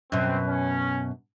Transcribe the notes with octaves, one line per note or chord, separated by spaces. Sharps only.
F#2 B2 C4
C#4